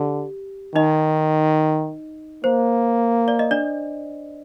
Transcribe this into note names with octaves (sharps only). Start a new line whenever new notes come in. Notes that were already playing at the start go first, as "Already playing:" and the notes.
Already playing: D3 G4
D#3 D#4 D#5
A#3 C5
D5
D#5
D4 D5